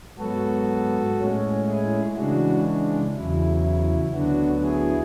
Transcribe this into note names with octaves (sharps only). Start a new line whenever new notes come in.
G#2 F#3 B3 F#4 A4
A2 G#3 C#4
E4 G#4
C#3 E3 G#3 D4 F#4
D4
E2 C#3 F#3 E4
E4
D2 D3 F#3 B3 D4 F#4
E4 G#4